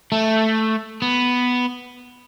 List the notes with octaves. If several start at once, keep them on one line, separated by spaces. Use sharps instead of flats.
A3
B3